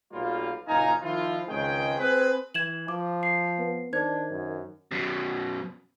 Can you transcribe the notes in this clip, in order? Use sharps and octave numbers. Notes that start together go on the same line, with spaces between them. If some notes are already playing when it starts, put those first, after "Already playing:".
B1 F#3 G3 A#3 F4
F#1 A#2 D#4 F5 G#5 A#5
D#3 F3 E4 F4
C#2 D#3 G#3 C4 G#4 G5
C4 G#4 B4
E3 G#6 E7 F#7
F3 D6
C7
B3
D#3 D4 C5 G#6
F#2
F#2 B2